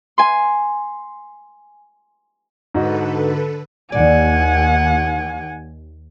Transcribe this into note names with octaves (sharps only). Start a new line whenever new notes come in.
G#5 C6
G#2 D3 F#4 A4 B4 D#5
D#2 D5 F#5 G#5